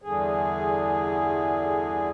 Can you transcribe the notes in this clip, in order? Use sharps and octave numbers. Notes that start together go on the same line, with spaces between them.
E2 G2 D3 G#4